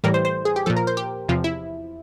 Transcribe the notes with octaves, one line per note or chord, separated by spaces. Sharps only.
A2 E3 G3 A#4
C5
C5
G#4
G4
A#2 F3 A4
A#4
C5
G4
E2 C3 F3 F4
E4